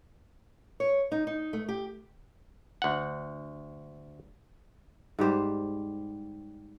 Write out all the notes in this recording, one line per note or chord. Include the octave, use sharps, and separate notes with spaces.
C#5
D#4
D#4
A3
G4
D2 F#5
G#2 G3 G4 C5